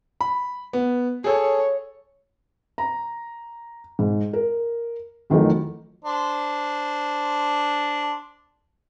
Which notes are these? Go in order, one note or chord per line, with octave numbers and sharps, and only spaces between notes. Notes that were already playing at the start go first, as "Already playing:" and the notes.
B5
B3
G#4 A4 C#5
A#5
G#2
A#4
F2 D#3 E3 F#3 A3
D4 C5